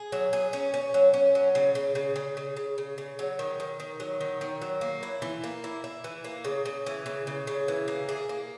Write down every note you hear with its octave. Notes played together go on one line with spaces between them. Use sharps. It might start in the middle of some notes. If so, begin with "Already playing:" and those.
Already playing: G#4
F#3
G#4
C#4
C#4
F#3
C#4
F#3
C#3
C#3
C#3
C#3
C#3
C#3
C#3
C#3
F#3
D#3
D#3
D#3
F#3
D#3
D#3
F#3
A#3
E4
E3
A#3
E4
E4
E3
A#3
C#3
C#3
E3
C#3
C#3
C#3
E3
A#3
G#4
A#3